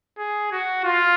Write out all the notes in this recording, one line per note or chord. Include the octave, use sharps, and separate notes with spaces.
G#4
F#4
F4